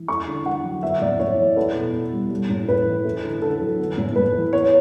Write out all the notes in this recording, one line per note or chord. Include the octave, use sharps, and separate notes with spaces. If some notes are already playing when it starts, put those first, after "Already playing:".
Already playing: E3
A3 C#6
D3
D3 F#5
F#3
B3 E5
A2 D5
A2 C#5
E3
B3 A4
B2
B2
G3
G3
A2
A2 B4
E3
A3
D3
D3 A4
F#3
B3
A2
A2 B4
E3
B3 C#5